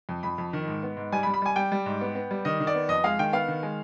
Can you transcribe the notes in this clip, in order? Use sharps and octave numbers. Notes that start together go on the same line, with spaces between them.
F2
F2 B5
F2
D#3
G#2
B3
G#2
G3 G#5
B5
G3
B5
G3 G#5
G3 G5
G3
G#2
B3
B3
G3
D#3 D#5
D#3
D5
B3
F2 D#5
G#3 F5
D#3 G5
B3 F5
D#3
G#3